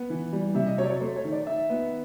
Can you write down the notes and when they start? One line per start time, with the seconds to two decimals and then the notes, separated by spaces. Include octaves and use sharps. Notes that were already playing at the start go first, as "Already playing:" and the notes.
Already playing: B3
0.10 E3
0.32 G3
0.55 C3 E5
0.66 D#5
0.78 F#3 C#5
0.85 D5
0.90 C#5
1.01 A3 C5
1.16 C#5
1.24 D#3
1.32 D5
1.47 D#3 E5
1.70 B3